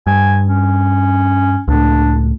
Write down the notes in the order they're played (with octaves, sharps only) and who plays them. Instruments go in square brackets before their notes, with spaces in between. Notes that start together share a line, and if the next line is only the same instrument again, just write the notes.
[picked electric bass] G2 [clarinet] G#5
[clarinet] C#4
[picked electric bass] C#2 A2 [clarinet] D4